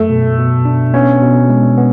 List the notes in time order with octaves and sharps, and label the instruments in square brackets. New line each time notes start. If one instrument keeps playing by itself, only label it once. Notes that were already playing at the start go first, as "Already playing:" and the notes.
Already playing: [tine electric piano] F#2 F#3 [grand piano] A3
[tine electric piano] B2
B2
D4
[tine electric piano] B3 [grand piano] C#4
[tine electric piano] B2
G#3
B3